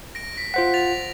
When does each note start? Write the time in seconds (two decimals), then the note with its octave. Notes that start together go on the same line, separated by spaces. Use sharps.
0.15 A#6 D7
0.38 B6
0.54 F4 C5 F#5 B6
0.74 A6 B6 F7